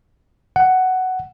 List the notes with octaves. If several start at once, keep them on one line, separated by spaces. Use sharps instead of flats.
F#5